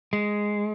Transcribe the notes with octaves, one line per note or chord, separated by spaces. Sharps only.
G#3